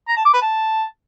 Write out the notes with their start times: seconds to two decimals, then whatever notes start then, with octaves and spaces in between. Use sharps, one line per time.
0.08 A#5
0.17 A5
0.25 D6
0.34 B4
0.42 A5